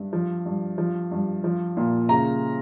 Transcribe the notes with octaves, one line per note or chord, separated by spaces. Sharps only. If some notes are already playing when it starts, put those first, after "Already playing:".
Already playing: G2
F3
G2
F3
G2
F3
A#2
C#3 A#5